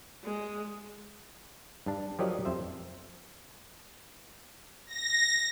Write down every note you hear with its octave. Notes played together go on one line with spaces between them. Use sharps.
G#3
G2 D4
F3 F#3 G4 A#4 D5 D#5
F2 C5 E5
A#6